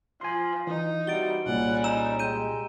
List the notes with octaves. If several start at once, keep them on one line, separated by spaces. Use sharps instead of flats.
F3 G#5 C6
E3 D#4
C3 E3 G3 F#4 A6 D7 G7
C2 A#2 G3 G#3 C#4 F#5
D#4 A#5 E6 E7
G#3 G4 G6 D#7